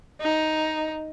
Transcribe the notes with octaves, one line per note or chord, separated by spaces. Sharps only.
D#4